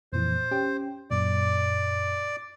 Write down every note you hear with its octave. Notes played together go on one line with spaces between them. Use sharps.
F2 A#2 E3 C5
C#4 G4 G5
F#2 A#2 D5